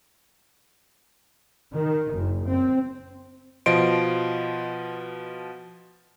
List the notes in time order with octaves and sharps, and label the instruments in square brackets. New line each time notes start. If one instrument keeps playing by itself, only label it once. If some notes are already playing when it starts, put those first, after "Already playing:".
[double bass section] D#3
F#1
C4
[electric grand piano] B2 F3 D#5 C6 D7